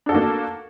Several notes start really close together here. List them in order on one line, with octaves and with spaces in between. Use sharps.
D4 A4 F#4 A#3